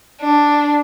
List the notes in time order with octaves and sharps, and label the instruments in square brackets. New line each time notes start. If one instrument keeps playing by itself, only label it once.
[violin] D4